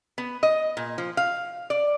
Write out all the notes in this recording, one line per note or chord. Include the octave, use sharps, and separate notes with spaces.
B3
D#5
A#2
F3
F5
D5